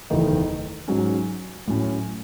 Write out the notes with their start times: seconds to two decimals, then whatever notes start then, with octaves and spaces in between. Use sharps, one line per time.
0.10 F#1 E2 D#3 A3 D#4
0.88 G#2 F#3 C#4
1.67 A2 F#3 C#4